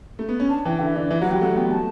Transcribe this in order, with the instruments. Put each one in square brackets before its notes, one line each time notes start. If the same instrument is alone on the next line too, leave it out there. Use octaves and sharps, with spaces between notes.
[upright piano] A3
B3
C#4
[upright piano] D4 [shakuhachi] A5
[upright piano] E3 [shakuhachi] G5
[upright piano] D3 [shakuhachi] E5
[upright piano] D3 [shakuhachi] D5
[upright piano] E3 [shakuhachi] E5
[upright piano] F#3 [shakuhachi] F#5
[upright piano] G3 [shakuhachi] G5
[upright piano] A3 [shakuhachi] F#5
[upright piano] B3 [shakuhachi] G5
[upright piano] A3 [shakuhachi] A5